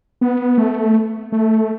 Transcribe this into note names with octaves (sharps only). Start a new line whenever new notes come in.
B3
A3
A3